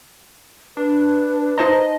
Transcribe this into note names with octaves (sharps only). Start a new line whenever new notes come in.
D4 B4
D#4 C5 D#5 A5